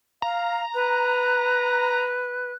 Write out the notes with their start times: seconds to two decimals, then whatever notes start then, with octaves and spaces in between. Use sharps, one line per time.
0.22 F5 A#5
0.74 B4 F#6